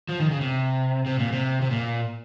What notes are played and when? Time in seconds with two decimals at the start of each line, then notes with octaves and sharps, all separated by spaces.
0.09 F3
0.20 D#3
0.30 C#3
0.41 C3
1.06 C3
1.19 A#2
1.32 C3
1.62 C3
1.71 A#2